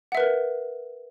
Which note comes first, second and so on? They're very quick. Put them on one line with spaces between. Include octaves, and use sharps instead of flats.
F#5 E5 B4 A#4